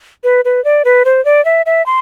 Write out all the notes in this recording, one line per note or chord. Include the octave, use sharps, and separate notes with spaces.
B4
B4
D5
B4
C5
D5
E5
E5
C6